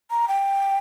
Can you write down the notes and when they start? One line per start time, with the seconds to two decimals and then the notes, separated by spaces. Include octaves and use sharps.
0.10 A#5
0.28 G5